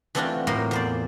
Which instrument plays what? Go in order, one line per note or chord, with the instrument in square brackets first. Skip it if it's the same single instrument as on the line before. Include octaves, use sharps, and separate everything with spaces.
[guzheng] E3 A3 C4 D4 F4 F#4
A2 A#3 A#4 C5
E2 C5 D5